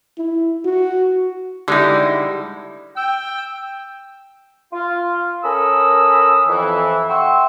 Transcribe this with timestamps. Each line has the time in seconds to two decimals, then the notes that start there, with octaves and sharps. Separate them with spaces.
0.18 E4
0.65 F#4
1.68 D3 G3 G#3 D#4 E4
2.96 G5 E6
4.73 F4
5.43 C#4 A4 A#4 B5 D#6 E6
6.47 F2 E3
7.09 E5 F#5 G5 C6 C#6 E6